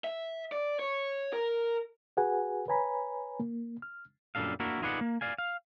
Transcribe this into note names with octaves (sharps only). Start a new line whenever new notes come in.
E5
D5
C#5
A#4
F#4 G#4 B4 F#5 G#5
B4 C#5 G#5 A#5 B5
A#3
F6
F#2 A#2 G3 D4 A4 F5
A#3 D4 E4 F#4 A#4
D#4 F4 G#4 B4 D5 F#5
A#3
D5 F5 G#5
F5